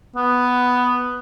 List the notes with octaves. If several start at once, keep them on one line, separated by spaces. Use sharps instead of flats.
B3